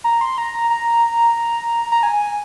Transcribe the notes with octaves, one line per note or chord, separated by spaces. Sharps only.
A#5
C6
A#5
A#5
A#5
A#5
G#5